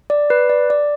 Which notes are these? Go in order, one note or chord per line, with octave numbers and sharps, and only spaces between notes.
D5
B4
D5
D5